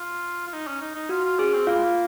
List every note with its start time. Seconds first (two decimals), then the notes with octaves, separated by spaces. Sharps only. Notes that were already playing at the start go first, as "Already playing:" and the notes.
Already playing: F4
0.47 F4
0.53 D#4
0.67 C#4
0.81 D#4
0.95 D#4
1.09 F4 F#4
1.25 F4
1.39 C#4 G#4
1.53 C4
1.67 A#3 F4 F5
1.75 G#3
1.83 A#3